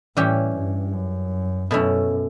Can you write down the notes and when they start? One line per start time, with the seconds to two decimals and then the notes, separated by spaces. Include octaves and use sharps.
0.17 A2 E3 G3 C#4 G4
0.55 G2
0.94 F#2
1.71 F#2 B2 A3 C#4 E4